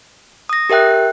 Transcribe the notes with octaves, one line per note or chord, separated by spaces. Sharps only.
D#6 A#6
G4 A#4 E5 G5 F#6